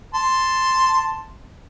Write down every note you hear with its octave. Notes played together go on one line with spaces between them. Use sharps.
A5 C6